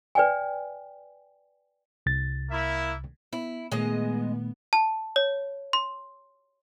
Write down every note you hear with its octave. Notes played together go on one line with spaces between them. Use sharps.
B4 D5 G5 G#5
C2 A6
A#3 E4 E5
B3 E4
A#2 D#3 G#3 A3 B3 D#5
A5
C#5
C6